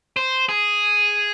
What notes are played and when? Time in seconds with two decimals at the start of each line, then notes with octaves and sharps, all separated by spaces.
0.17 C5
0.49 G#4